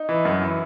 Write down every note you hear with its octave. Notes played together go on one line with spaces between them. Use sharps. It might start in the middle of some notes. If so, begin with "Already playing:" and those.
Already playing: D#4
E3
F#2
E3